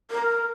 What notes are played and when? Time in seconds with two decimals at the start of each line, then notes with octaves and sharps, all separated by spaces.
0.11 A#4